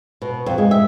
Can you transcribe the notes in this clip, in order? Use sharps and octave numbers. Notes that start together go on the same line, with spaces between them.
B2
F2
G#3
E5